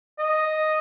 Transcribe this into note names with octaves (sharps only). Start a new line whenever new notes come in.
D#5